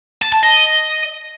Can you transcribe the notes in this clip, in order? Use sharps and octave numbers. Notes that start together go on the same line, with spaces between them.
A5
A5
D#5